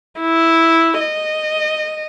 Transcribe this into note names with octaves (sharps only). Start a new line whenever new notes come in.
E4
D#5